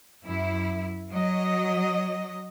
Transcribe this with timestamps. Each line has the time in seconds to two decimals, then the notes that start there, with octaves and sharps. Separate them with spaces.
0.25 F#2 E4
1.12 F#3 D#5